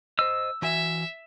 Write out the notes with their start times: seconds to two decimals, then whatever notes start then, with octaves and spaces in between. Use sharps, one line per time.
0.19 C5 D#5 E6
0.62 E3 F#4 E5 G#5